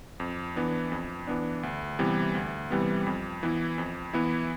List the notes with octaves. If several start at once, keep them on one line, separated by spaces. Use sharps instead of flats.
F2
E3 B3 D4
F2
E3 B3 D4
D2
C3 E3 G3 B3
D2
C3 E3 G3 B3
F2
E3 B3 E4
F2
E3 B3 E4